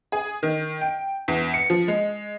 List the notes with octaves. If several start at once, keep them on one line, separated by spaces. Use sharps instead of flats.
G#4
D#3
G5
E2
C#7
F3
G#3